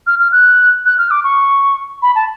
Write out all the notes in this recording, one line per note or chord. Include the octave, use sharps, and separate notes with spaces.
F6
F6
F#6
F#6
F6
D6
C#6
B5
A5